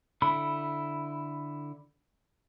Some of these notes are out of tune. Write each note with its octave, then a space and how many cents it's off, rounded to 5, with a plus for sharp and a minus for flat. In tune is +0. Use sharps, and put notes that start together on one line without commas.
D3 +0 E4 +5 B5 -5